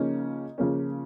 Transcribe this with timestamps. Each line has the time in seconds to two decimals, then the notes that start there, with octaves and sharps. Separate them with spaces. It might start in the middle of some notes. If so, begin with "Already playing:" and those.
Already playing: C#3 F3 A#3 C#4 D#4
0.58 C#3 F3 A#3 C#4